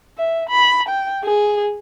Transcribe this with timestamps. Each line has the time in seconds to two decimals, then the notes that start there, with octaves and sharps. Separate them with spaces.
0.18 E5
0.50 B5
0.88 G5
1.24 G#4